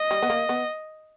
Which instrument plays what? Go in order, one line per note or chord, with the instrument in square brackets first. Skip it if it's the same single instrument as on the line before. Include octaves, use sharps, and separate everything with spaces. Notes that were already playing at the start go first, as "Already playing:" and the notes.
Already playing: [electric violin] D#5
[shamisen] G3
B3
A#3
B3